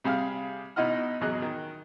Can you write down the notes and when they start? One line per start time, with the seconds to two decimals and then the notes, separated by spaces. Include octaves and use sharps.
0.04 C3 G3 G#4 F5 F6
0.76 B2 D#4 E4 D#5 F#5 F6
1.21 A1 E2 F#3 G#4 D#5 F#6
1.42 D#3